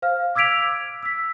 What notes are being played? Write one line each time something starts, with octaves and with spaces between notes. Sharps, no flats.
C5 F5 F6
D6 E6 G#6 B6 D7 F7
G#6
E6 B6